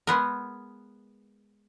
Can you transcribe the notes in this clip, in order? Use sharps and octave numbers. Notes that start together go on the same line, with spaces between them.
G#3 B3 A#4